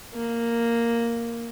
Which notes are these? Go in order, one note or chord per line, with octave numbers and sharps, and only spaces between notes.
A#3